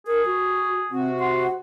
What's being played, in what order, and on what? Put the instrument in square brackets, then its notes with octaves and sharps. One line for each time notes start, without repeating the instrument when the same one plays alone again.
[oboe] G#4 [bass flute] A#4
[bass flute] F#4
[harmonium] C3 F#4 [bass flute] C4
[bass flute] F#5 [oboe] C6